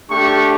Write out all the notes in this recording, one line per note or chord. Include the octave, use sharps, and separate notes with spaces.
A3 D4 G4 C#6